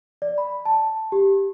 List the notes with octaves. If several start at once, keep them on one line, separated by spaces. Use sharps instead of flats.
D5
B5
A5
G4